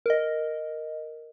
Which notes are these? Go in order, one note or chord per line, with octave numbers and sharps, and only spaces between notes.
A#4 D#5